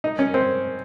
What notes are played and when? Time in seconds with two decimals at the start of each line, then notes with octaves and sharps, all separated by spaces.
0.04 D#4
0.19 C#4
0.34 C4